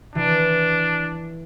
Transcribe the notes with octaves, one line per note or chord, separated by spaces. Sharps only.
E3 D4